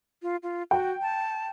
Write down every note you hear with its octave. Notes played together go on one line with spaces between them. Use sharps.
F4
F4
F#4 G5
A5